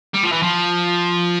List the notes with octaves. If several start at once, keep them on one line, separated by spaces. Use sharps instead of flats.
G3
F3
E3
F3